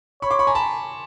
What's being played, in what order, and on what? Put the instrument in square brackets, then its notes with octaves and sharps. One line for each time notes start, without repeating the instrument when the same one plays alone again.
[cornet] C#5 [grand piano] B5 C#6
[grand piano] C6 D6
B5 C#6
G#5 A#5
A5 B5